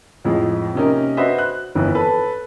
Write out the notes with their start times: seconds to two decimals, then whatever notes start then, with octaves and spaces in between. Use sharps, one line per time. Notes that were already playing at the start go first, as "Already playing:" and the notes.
0.24 F2 A2 F3 G#3
0.75 C3 A#3 C#4 D#4 A#4
1.17 D4 F#4 B4 C5 D#5 E5
1.38 F#6
1.75 G1 F2 D#3 E3
1.95 A4 B4